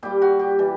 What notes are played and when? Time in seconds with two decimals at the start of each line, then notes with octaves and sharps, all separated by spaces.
0.03 A#2 G3 G4
0.22 F#4
0.39 G4
0.59 E3 G3